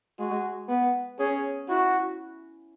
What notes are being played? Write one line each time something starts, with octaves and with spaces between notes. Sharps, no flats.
G#3 F#4
B3
C#4 G#4
E4 F#4